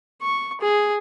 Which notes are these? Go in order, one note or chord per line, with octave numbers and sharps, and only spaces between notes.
C#6
G#4